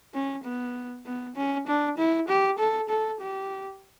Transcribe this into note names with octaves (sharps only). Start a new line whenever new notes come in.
C#4
B3
B3
C#4
D4
E4
G4
A4
A4
G4